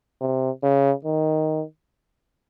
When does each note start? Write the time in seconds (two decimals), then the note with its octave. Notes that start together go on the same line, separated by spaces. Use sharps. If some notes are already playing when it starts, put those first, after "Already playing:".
0.21 C3
0.63 C#3
1.04 D#3